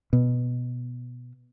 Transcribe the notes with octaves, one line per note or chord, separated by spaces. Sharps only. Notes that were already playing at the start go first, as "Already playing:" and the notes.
B2